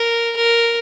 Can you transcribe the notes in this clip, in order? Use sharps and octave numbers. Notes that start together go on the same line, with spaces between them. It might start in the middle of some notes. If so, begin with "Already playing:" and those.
Already playing: A#4
A#4